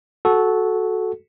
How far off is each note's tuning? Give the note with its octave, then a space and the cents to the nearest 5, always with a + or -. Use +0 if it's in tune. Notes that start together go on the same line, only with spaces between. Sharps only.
F#4 +0 A4 -15